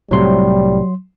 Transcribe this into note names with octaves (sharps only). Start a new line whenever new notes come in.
C2 A2 C3 F#3 G3 C6